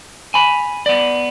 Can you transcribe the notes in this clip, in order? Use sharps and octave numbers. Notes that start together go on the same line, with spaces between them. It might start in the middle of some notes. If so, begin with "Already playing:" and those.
G#5 B5
B3 D5